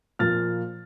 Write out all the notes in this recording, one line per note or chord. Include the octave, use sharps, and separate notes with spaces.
A#2 F3 A#3 F6 A6